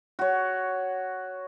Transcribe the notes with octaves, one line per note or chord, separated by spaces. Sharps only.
F#4 C#5